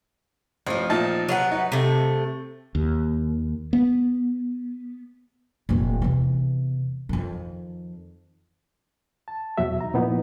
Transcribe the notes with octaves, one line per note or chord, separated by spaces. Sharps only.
A1 F3 C4
A#2 D#4 A5
F#3 B3 F#5
D#4
C3 A3
D#2
B3
F1 A#1
E2 C3
F2 D#3
A5
E2 B2 F#3 F#4 E5
D#4 A#5
A#2 F3 B3 D#4 E4